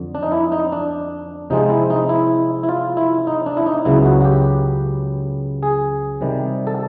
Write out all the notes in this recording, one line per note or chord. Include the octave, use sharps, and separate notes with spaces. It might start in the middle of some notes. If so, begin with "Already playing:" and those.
Already playing: F2 D3
D4
D#4
E4
D#4
D4
C3 F3 G#3 C4 D#4
E4
D#4
E4
E4
F4
E4
D#4
D4
E4
D#4
C#2 C#3 F#3 B3 E4
F#4
F#4
G4
G#4
C3 D#3 G3
A4